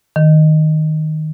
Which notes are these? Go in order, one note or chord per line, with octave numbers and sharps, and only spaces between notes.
D#3